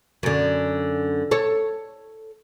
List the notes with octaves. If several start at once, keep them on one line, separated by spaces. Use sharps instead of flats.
F#2 D3
A4 C#5